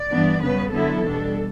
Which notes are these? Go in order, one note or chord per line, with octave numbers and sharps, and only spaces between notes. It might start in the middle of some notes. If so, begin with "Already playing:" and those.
Already playing: D5
G2 E3 B3 D4
F#2 C#3 G3 B3 B4
D3 F#3 B3 E4 A4
E2 B2 G3 D4